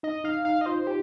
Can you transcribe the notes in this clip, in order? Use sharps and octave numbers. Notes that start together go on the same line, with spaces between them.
D#4 D#5
D#4 F5
D#4 F5
D#5
F4 C5
G4